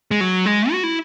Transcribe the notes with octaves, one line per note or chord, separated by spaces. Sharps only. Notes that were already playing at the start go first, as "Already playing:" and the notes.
G#3
F#3
G#3
F#4
E4